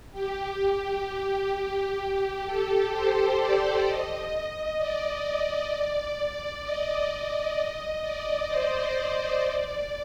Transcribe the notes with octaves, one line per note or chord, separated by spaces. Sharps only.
G4
G4
A4
C5
D5
D#5
D5
D#5
D5
D#5
D5
C5
D#5
D5